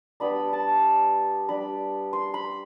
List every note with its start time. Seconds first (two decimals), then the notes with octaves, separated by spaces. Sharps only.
0.20 G3 B3 D4 B5
0.53 A5
1.48 G3 D4 B5
2.13 C6
2.34 B5